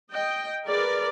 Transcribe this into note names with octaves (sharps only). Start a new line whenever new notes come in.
D#5 G5
G#4 A#4 B4 D5